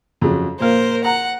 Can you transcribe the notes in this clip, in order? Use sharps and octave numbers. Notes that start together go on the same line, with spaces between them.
F2 C#3 F#3
A#2 A#4 C5 F5
F#5 A#5